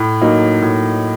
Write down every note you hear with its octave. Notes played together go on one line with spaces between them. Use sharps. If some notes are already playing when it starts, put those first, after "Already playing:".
Already playing: A2
F#3 A#3 D#4
A2